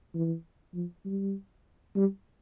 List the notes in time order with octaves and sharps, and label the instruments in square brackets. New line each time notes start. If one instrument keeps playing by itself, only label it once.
[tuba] E3
F3
G3
G3